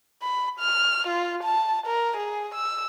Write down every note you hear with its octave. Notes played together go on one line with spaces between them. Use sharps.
B5
F6
F4
A5
A#4
G#4
E6